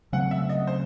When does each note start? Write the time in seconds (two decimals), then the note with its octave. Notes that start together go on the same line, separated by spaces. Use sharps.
0.12 C#3 F#3 A3 C4 F#5
0.31 E5
0.49 D#5
0.67 C5